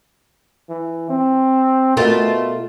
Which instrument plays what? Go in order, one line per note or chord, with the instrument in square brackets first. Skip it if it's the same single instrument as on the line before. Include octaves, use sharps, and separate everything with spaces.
[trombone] E3
C4
[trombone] B2 [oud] A3 F4 A#4